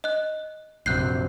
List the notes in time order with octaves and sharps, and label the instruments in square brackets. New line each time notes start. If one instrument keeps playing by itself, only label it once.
[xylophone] D#5 F#6
[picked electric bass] A#1 F#2 C3 [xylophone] F#6 G6 C7